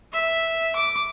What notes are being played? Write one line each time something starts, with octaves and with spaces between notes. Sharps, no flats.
E5
D6